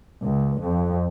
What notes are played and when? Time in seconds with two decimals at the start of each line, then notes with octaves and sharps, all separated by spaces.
0.21 C#2
0.61 F2